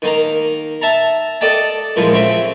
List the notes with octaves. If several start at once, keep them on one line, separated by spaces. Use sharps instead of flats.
D#3 A#3 A#5
E5 A5 A#5
A4 D5 D#5 G5 A5
A#2 E3 F3 G#3
C#3 C4 E5